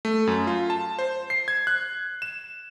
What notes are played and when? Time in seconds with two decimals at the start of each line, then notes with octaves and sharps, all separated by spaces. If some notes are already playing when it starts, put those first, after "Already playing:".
0.05 A3
0.27 F#2
0.47 F4
0.70 A5
0.99 C5
1.30 C7
1.48 G#6
1.67 F#6
2.22 E7